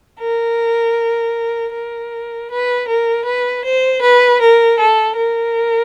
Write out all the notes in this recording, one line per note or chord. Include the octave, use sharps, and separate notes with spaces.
A#4
A#4
B4
A#4
B4
C5
B4
A#4
A4
A#4